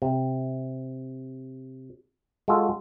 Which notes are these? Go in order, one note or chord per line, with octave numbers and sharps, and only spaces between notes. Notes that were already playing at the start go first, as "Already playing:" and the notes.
C3
G#3 F4 F#4 G#4 A4